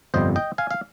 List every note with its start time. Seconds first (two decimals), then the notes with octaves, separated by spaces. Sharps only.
0.14 G1 F2 C3 G3 C5 D#5
0.36 D#5 G5
0.58 F5 G#5
0.71 F5